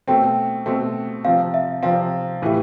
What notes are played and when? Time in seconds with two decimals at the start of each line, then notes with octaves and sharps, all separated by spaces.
0.08 B2 A3 C4 G5
0.66 B2 A3 C4
1.25 C3 F3 C4 F5
1.54 E5
1.83 C3 F3 C4 F5
2.42 A2 E3 A3 E4 G4